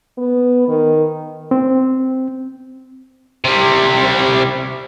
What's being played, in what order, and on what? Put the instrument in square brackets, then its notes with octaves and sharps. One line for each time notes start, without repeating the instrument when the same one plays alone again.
[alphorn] B3
D#3
[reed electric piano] C4
[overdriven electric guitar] C3 G3